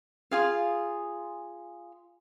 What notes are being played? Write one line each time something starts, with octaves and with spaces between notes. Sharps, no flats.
F4 G#4 F5